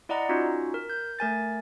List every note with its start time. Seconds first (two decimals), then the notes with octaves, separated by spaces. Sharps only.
0.09 E4 D5 D#5 F#5 A#5
0.29 C#4 D#4 F4 F#4
0.74 A#4
0.90 G6
1.19 A3 A#4 G#5 A6